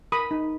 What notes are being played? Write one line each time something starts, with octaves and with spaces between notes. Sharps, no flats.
A#4 B5 D#6
D#4